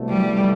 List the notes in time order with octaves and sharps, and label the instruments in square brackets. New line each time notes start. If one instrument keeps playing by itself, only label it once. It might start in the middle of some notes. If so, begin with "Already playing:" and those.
Already playing: [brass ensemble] C2 B2 A3
[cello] G3